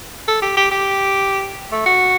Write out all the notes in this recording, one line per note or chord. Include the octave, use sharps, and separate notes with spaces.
A4
G4
G4
G4
A3
F#4